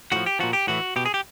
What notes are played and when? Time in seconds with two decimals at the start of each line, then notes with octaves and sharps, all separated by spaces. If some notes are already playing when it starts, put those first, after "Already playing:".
0.12 A2 F3 F#4
0.26 G4
0.39 A#2 F3 F#4
0.53 G4
0.67 A2 E3 F#4
0.96 B2 G4
1.06 G#4
1.14 G4